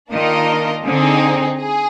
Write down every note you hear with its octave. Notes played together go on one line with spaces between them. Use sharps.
D#3 A#3 D4 F4 A#4 D#5
D3 C4 D#4 G#4
G#4